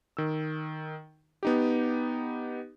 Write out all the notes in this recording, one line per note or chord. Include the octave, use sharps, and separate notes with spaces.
D#3 E6
B3 D#4 G4